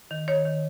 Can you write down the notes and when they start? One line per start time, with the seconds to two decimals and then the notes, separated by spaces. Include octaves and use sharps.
0.11 D#3
0.28 D#3 C#5
0.45 D#3